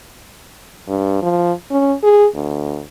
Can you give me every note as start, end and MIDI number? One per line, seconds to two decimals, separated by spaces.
0.88 1.21 43
1.22 1.52 53
1.70 1.94 61
2.03 2.26 68
2.35 2.83 38